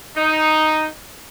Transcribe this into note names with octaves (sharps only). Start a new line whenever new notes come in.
D#4